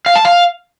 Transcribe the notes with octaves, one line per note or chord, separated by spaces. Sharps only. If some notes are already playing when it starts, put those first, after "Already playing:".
F5
A5
F5